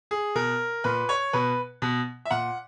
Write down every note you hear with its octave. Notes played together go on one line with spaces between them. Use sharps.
G#4
B2 A#4
A#2 B4
C#5
B2 B4
B2
E5
A#2 F#5